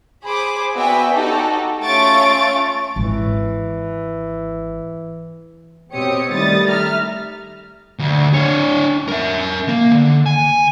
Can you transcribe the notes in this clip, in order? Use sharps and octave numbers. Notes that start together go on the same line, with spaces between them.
G#4 C5 B5 D6
B3 F#4 D5 E5 G5 G#5
D#4 F#4 G4 A4
A3 C#4 F4 C#6 A6 D7
G#1 E3
B2 C4 G4 C#5 D#6 C#7
D#3 G3 A3 E4 D#6 A6
E5 A#5 F6
D2
D4 C#5
A#4 E5
A#3
D3
G#5